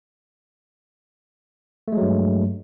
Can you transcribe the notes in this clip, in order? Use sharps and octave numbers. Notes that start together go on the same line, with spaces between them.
G2 F#3 G#3 A3